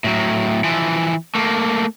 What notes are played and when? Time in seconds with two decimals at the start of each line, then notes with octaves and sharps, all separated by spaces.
0.04 A2 F#3
0.64 E3 F3
1.35 A3 A#3